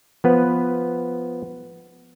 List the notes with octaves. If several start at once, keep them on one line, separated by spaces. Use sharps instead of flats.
F3 B3 B4